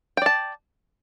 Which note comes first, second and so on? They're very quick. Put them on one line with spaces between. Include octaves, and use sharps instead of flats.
G5 D5 A5